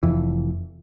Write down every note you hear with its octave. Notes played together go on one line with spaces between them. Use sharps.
F1 F2 E3